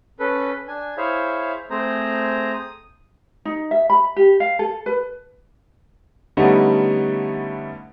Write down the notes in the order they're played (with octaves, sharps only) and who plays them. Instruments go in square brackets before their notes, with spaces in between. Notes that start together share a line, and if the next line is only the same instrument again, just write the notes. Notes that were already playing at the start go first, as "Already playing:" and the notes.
[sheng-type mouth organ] C#4 A4 B4
D4 G#5
E4 G#4 C5 C#5 E5 F5
A3 C4 G#4 C5 A#5
D#6
[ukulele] D#4
E5
B5
G4
F5
A4
B4
[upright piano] D3 G3 A3 B3 C#4 D#4